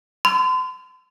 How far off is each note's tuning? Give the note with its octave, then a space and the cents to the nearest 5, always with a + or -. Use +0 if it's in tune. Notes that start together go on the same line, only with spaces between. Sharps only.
C6 -40